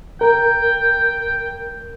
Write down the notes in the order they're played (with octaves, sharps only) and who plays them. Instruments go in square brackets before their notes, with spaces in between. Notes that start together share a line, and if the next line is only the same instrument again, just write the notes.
[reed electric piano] A#4 [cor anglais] G5